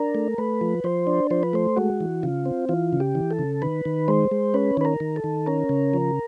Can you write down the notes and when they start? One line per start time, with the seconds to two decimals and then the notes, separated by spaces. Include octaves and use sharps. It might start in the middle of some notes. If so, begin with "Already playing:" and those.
Already playing: D4 A#4
0.15 A3
0.38 A3 B4
0.61 F3
0.84 F3 C5
1.07 D4
1.31 F3 C5
1.43 B4
1.53 A3 C5
1.76 G#3 F#4
2.01 E3
2.23 C#3 F4
2.46 C4
2.69 E3 F4
2.93 C#3
3.00 G4
3.15 E3
3.31 A4
3.39 C#3
3.62 D#3 B4
3.85 D#3
4.08 G#3 C5
4.31 G#3
4.54 C#4 B4
4.77 D#3 B4
4.85 A#4
5.00 D#3
5.16 A4
5.24 D#3
5.46 C#4 A#4
5.69 C#3
5.94 F3